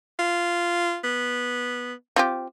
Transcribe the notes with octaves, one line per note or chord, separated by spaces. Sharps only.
F4
B3
C4 F4 G4